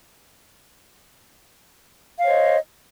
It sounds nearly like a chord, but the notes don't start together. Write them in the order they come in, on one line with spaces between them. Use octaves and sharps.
F5 C#5 C5 D#5